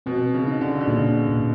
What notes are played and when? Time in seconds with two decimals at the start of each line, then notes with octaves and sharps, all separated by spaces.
0.06 B2 C4
0.34 C#3
0.47 D#4
0.61 D3
0.81 D3
0.88 A#2 C#3
1.29 A#2